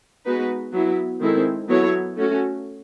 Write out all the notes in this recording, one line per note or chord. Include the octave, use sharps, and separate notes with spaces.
G#3 B3 D#4 F#4 B4
F#3 B3 E4
D#3 G#3 C4 E4 A4
F#3 B3 E4 A4 C#5
A3 C#4 F#4